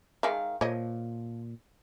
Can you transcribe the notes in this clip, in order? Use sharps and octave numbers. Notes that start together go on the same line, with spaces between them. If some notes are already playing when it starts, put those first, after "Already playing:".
D#3 G#3 A#4 E5 F5
A#2 F3 C#5 D#5